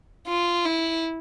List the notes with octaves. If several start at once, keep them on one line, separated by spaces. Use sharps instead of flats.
F4
E4